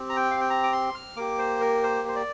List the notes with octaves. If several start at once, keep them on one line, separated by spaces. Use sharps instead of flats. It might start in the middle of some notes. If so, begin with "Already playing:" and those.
Already playing: C4 G4
A#5
G5
F5
G5
A#5
D6
C6
F6
A#3 G4 D6
C5
A#4
C5
C5
D5